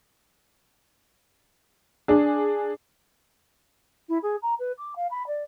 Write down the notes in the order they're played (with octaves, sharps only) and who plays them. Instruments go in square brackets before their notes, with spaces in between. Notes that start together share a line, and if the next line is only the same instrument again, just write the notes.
[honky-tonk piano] D4 G#4
[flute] E4
G#4
A#5
B4
D6
F5
B5
D5